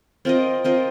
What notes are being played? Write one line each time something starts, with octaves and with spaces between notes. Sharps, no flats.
C4 F4 A#4 D#5
C4 F4 A#4 D#5